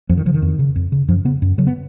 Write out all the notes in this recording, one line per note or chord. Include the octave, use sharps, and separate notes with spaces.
F2 F3
D#3
C#3 F3
D#3
F2
C#3
F2
C#3
F#2 F3
C#3 B3
F#2
C#3 F#3
B3